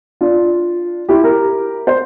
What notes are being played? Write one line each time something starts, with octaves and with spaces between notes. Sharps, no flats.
D4 F4
E4 G4
G4 A#4
C5